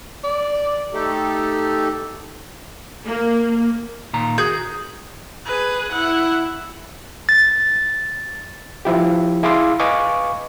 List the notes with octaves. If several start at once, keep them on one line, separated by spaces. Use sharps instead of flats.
D5
A3 D#4 G4 A4
A#3
A#2 D#3 A#5
F#4 G#4 G6
G#4 B4
E4 F#5
A6
F3 E4 G4
E4 G#4 F5 C6 D6 E6
B4 D#5 F5 G#5 C#6 D6